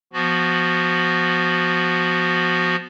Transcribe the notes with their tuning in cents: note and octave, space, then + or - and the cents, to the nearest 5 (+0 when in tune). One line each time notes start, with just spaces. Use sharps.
F3 +0 B3 +0 F#4 +0